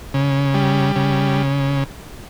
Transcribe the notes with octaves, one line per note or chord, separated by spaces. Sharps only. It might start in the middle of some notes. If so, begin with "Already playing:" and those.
C#3
G3
C#3